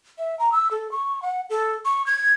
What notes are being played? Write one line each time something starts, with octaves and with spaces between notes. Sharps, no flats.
E5
A#5
E6
A4
C#6
F#5
A4
C#6
G#6